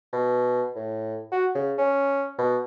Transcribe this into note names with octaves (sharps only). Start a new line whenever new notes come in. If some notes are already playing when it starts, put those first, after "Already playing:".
B2
A2
F#4
C#3
C#4
B2